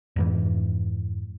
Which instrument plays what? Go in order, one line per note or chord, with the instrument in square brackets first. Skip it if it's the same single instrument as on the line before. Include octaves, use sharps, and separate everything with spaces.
[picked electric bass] F2 G#2 E3